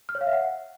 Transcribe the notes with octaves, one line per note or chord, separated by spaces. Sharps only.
F6
C#5
F5
E5
F#5